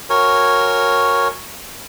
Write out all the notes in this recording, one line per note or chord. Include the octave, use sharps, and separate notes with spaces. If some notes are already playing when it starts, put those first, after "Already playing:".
F#4 A#4 C#5 G#5